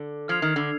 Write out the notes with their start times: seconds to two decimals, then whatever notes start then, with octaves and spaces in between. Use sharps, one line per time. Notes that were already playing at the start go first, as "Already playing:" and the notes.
Already playing: D3
0.28 F3 F6 G#6 C7 F7
0.42 D#3
0.56 D3